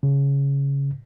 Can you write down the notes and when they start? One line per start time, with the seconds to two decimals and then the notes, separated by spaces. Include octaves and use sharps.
0.03 C#3